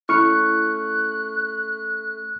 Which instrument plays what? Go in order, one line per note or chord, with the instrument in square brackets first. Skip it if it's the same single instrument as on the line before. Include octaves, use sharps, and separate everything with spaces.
[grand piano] A3 C#4 [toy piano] E4 B5 [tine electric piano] C#6 F6 C#7 [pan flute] F#6